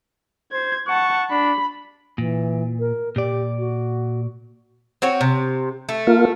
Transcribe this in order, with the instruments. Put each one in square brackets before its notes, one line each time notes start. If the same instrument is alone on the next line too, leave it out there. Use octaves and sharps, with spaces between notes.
[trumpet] C5 [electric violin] G#6
[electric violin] F#5 A5 [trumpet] C#6
[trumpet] D4 [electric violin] B5
[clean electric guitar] A#2 [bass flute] E3
[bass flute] A#4
[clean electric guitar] A#2 D5 [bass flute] G4
[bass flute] F#4
[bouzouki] C4 F#4 C#5
C3
A3
[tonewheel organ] A#3 F4